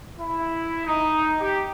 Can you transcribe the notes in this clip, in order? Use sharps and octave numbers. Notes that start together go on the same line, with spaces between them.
E4
D#4
G4